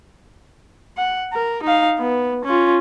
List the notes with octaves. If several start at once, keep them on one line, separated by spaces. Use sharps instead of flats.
F#5
A#4
D#4 F5
B3
C#4 F4